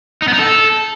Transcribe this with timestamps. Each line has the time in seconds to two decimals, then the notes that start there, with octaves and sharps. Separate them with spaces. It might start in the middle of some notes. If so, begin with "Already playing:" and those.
0.22 D#4
0.28 B3
0.33 D#4
0.39 A4